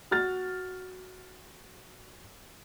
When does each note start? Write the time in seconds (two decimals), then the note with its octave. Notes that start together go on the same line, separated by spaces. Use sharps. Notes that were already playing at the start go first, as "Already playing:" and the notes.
0.11 F#4 F6 A6